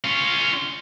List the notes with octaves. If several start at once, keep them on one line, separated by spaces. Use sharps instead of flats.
C#4 F4